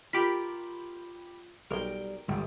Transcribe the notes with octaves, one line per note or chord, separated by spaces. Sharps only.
F4 G4 A#4 B5
B1 G3 A#4 G5
G1 E2 A#2 G3 G#3